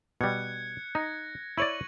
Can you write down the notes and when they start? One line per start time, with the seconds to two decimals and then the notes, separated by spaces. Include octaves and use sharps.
0.21 B2 G3 F#6 G#6 C#7
0.95 D#4 A#6
1.58 E4 C#5 D5 C#6 D#7 F#7